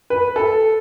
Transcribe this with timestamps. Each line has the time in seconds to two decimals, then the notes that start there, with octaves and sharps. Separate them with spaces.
0.10 B4
0.36 A4